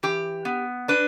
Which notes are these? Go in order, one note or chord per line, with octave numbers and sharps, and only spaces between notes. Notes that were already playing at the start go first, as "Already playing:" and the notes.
E3 G4
B3
D4 B4